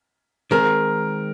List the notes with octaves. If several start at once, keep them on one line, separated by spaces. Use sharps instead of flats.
D#3 G#3 C4 A#4